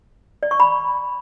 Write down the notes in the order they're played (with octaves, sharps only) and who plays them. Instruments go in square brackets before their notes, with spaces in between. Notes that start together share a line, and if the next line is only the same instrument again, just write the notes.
[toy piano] D5
C#6
B5